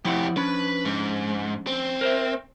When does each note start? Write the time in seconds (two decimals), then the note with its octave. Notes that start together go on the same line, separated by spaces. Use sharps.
0.05 F2 F3 E4 G4 F#5
0.37 F3 C#4 D4 B4 B5
0.85 G#2
1.67 C4
2.01 A#4 C5 E5